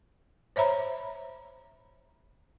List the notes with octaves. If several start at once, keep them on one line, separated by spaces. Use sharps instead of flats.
C5 C#5 E5 A#5 B5